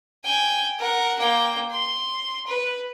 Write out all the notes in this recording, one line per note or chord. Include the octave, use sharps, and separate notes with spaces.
G5 G#5
A#4 F#5
A#3 G5
C6
B4